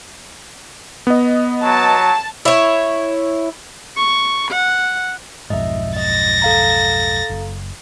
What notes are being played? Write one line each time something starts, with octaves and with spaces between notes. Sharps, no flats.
B3 D#5
F#3 A5
E4 C#5
C#6
F#5
B1 F2 G#2 D#5 E5
D#5 A6 A#6
A4 F5 A#5
F#1